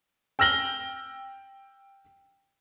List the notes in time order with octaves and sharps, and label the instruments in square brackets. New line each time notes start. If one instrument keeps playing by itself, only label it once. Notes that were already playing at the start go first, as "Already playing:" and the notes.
[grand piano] G5 E6 F6 A#6 F#7 G7